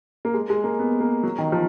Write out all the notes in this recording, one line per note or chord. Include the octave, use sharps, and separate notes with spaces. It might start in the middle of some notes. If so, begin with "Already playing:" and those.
A#3
G#3
G#3
A#3
B3
A#3
F#3
D#3
F3